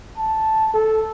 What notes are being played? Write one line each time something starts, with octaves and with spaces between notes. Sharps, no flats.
A5
A4